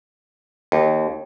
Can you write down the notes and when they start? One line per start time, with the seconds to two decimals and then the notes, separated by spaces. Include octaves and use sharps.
0.72 D#2